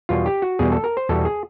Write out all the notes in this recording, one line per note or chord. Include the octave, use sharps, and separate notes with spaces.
E2 B2 G3 F4
G4
F#4
E2 B2 G3 G#4
A4
A#4
C5
E2 B2 G3 A4
G#4